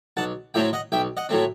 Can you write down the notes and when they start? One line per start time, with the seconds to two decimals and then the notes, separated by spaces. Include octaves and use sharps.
0.17 B1 F#5 A5
0.54 A2 F#3 A3 C4 E5 G5
0.73 D#5 F#5
0.92 B1 E5 G5
1.17 D#5 F#5
1.29 A2 F#3 A3 C4